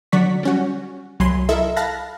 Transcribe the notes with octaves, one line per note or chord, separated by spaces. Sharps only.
D3 F#3 D5 F#5 C#6 B6
G3 C#4 F#4
C2 F#3 G#5 B5 C6
E4 A4 A#4 D#5 E5
F5 A5 B5 F#6 A#6